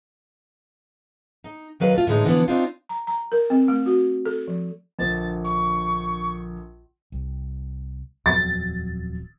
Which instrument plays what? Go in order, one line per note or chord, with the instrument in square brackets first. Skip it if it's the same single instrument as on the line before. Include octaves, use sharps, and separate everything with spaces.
[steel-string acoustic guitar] D#4
D#3 F#3 B4 F5
A3 F4
A2 D3 E3 G#3 D#4
D3 E3 F3 A3 B3 D4
C4 D4 D#4 F4
[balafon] A#5
A#5
A#4
C4
A3
F#4
A4
F3
[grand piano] A#1 D3 [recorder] A6
[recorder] C#6
[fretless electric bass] C2
[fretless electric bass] D#1 F2 F#3 [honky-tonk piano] A6